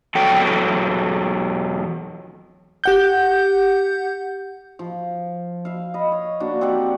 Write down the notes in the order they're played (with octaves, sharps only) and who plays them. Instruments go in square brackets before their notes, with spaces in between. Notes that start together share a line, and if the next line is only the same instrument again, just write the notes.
[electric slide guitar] E2 F#3 A4 G5
[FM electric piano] G4 F#5 G6
[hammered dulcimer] F3
E5 F5
D#5 B5
C#5
A#3 D4 F#4
C4 G4 D5 F#5